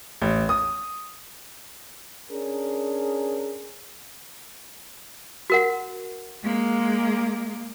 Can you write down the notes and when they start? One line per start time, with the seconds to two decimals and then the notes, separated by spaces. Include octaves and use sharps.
0.22 A1
0.49 D#6
2.29 C#4 D4 G#4 A#4
5.50 F#4 A#4 F#5
6.43 G#3 A#3